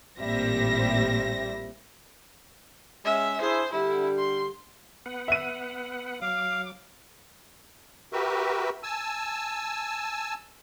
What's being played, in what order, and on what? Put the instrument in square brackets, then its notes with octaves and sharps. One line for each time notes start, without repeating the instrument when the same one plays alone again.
[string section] A1 A#2 G3 C4 E5 A#6
[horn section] G#3 C#4 [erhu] E5
[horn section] D4 E4 G#4 [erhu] C5
[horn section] D3 G3 [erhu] E4
[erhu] C6
[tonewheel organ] B3 B4 F#5
[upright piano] E5 D#7
[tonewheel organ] F#3 D6 [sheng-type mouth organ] F5
[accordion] F#4 G4 A#4 B4 E5
G#5 A5 E6